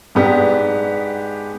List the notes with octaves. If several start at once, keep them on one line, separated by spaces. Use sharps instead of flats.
G#2 G#3 B3 D4 G4